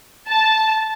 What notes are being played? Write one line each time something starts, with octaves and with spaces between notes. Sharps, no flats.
A5